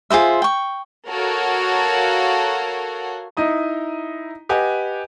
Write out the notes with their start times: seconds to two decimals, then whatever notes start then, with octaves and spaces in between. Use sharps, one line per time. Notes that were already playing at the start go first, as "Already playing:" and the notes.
0.10 F4 G#4 C5 E5
0.42 G5 C#6
1.08 F#4 A4 A#4 C#5 F5 F#5
3.37 D#4 E4 D#5 A#5
4.49 G4 B4 D#5 F#5 G#5